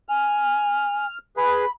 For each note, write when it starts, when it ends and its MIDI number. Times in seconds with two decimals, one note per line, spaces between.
0.09 1.05 80
0.09 1.18 89
1.37 1.65 68
1.37 1.65 71
1.37 1.70 83